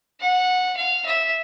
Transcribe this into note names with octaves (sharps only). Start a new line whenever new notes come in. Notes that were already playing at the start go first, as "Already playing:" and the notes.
F#5
F5
E5